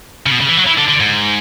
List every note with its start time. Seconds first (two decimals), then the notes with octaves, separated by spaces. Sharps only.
0.26 C#3
0.32 B2
0.40 C#3
0.49 E3
0.57 F#3
0.66 E3
0.78 D3
0.88 D3
1.00 G#2